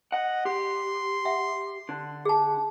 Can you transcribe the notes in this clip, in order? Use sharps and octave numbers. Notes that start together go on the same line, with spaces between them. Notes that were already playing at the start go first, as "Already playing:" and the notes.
D#5 F#5
G4 C6
E5 F#5
D3
G#4 A5